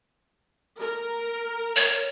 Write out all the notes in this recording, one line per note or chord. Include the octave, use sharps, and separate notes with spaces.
A#4
C#5